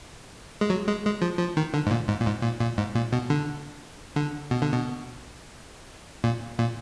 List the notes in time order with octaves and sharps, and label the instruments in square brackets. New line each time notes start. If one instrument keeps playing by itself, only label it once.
[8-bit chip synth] G#3
F#3
G#3
G#3
F3
F3
D#3
D3
G#2
A#2
G#2
A#2
G#2
A#2
A#2
G#2
A#2
B2
D3
D3
B2
D3
B2
A#2
A#2